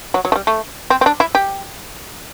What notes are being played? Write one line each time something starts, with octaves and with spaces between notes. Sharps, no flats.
F#3
F#3
A3
G3
A3
C4
C4
D4
E4
G4